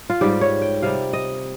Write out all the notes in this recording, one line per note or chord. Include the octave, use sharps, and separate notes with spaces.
F4
G#2 G3 G4
C#5
G5
C3 G3 F5
D#5